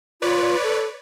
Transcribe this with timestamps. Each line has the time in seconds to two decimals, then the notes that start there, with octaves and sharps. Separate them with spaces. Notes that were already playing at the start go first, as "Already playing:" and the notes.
0.22 F4 B4 C#5 D5
0.63 A4